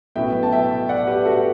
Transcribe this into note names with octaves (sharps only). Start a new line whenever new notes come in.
A1 A2 F#3 B3 E5 G5
A5
E5 G5
D5 F#5
G4 B4
F#4 A4